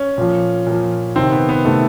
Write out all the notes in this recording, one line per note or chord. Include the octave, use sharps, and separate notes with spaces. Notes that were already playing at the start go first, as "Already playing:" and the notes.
Already playing: C#4
A#2 F3
A#2 F3
C3 D#3 C4
B3
B3
C3 D#3 A3